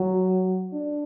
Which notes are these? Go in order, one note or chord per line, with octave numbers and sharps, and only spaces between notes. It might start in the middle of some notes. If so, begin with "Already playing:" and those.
Already playing: F#3
D4